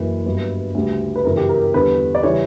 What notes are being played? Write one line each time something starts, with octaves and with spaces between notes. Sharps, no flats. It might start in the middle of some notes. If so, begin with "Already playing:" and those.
Already playing: F#1 F#2 E3 B4
G1 G2 F#3
D2 C#3 G3
B4
G1 F#2 C#3 E3 A#4
G4
A#4
A#4
E2 D3 G3 B4
D5
C#3 E3 G3 C#5